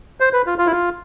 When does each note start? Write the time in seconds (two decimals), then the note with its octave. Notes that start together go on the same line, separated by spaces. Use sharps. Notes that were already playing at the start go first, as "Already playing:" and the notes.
0.20 C5
0.33 B4
0.47 F4
0.58 F4
0.67 E4
0.72 F4